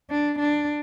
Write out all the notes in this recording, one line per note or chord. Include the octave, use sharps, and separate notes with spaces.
D4
D4